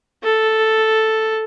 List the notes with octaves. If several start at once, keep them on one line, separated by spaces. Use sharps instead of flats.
A4